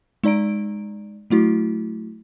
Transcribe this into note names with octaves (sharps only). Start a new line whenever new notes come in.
G#3 D#4 D5 A#5 D7
F#3 A3 E4 F#4